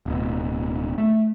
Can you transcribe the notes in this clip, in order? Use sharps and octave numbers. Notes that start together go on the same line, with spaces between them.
D1 B2
A3